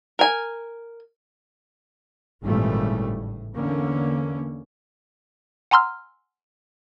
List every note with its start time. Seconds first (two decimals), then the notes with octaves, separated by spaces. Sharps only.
0.19 A#4 G#5
2.44 G#1 A#2 C#3 E3 G3 A3
3.12 A2
3.55 E2 D3 A#3 C#4
5.71 F#5 G#5 A#5 C6 E6 F6